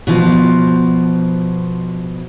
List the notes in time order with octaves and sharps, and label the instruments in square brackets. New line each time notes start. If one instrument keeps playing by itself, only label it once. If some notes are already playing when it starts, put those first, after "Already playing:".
[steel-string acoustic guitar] B2 F3